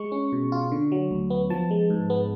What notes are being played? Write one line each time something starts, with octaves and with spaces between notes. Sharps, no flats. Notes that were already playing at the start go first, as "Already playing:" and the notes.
Already playing: G#3 C#6
C#4
B2
F4
D3
F#3
D2
B3
F3 A5
G#3
G#2
B3